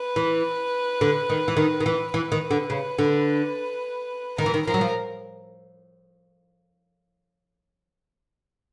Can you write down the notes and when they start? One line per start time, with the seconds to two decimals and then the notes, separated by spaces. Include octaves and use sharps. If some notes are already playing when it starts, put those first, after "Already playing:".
Already playing: B4
0.16 E3
1.01 D3
1.30 D#3
1.48 E3
1.57 D#3
1.80 D#3
1.86 E3
2.14 E3 B4
2.32 D#3
2.51 D3
2.70 C#3
2.99 D3
4.38 D#3 A#4
4.46 E3
4.54 D#3
4.67 F3 A#4
4.74 F#3
4.81 F3